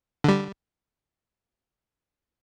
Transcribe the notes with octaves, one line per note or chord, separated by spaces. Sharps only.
D3 G3